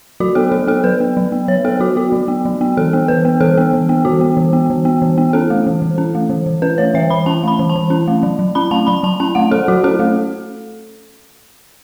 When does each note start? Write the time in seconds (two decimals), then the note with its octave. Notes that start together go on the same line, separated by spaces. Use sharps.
0.20 F#3 F#4
0.35 B3 A4
0.52 F#3 A4
0.67 B3 A4
0.84 F#3 B4
1.00 B3
1.17 F#3
1.32 B3
1.48 F#3 C#5
1.65 B3 A4
1.80 F#3 F#4
1.96 B3 F#4
2.12 F#3
2.28 B3
2.45 F#3
2.61 B3
2.77 E3 A4
2.93 B3
3.08 E3 B4
3.25 B3
3.40 E3 A4
3.57 B3
3.73 E3
3.89 B3
4.05 E3 F#4
4.21 B3
4.37 E3
4.53 B3
4.70 E3
4.85 B3
5.02 E3
5.18 B3
5.33 C#4 A4
5.50 A3
5.67 E3
5.82 E3
5.98 C#4
6.15 A3
6.30 E3
6.46 E3
6.62 C#4 B4
6.78 A3 C#5
6.94 E3 E5
7.10 E3 B5
7.26 C#4 A5
7.43 A3 B5
7.59 E3
7.70 A5
7.75 E3
7.90 C#4
8.08 A3
8.23 F#3
8.39 F#3
8.55 C#4 B5
8.71 A3 A5
8.87 F#3 B5
9.03 F#3 A5
9.20 C#4 A5
9.35 A3 F#5
9.51 F#3 A4
9.68 F#3 F#4
9.84 C#4 A4
9.99 A3